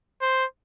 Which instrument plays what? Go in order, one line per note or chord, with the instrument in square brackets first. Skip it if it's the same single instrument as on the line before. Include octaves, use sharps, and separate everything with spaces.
[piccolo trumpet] C5